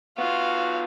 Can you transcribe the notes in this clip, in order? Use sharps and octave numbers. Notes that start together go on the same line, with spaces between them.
B3 F4 F#4 F5